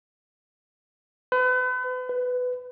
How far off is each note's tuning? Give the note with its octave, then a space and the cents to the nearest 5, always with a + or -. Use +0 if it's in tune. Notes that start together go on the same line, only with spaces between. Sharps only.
B4 +40
B4 +15